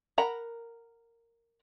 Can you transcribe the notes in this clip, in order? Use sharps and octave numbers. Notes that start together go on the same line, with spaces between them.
A#4 F#5 A#5 B5